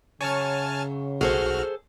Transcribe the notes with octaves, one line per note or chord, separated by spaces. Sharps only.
F#2 C#3 C#5 G#5 A5 F6
B1 F#4 G#4 A4 C5 F6